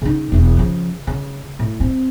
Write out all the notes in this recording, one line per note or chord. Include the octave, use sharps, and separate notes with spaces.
C#3 D#4
E1 E2
C#3 F3
C#3
A2
C4